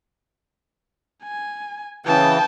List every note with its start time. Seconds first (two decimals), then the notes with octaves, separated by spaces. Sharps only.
1.23 G#5
2.06 C#3 E3 G5 A5